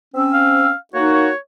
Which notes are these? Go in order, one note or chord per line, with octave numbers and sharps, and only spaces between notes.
C4 C#4 E6
F5
A#3 D#4 F#4 C#5
C#5